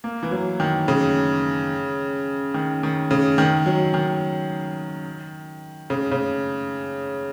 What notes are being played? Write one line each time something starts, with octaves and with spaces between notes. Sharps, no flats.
A#3
E3
F#3
D#3
C#3
D#3
D#3
C#3
D#3
F#3
D#3
C#3
C#3